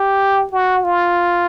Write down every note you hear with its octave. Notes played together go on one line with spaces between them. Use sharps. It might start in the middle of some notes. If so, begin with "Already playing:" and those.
Already playing: G4
F#4
F4